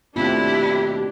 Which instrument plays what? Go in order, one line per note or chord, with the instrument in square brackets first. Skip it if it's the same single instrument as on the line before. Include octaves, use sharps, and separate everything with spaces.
[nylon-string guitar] D#2 B2 [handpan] A3 C4 F4 [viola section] D4 G4 [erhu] E4